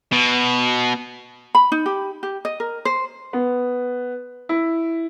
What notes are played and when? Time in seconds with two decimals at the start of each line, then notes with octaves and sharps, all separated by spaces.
0.13 B2
1.55 B5
1.72 D#4
1.86 G4
2.23 G4
2.45 D#5
2.60 A#4
2.85 C5
3.33 B3
4.49 E4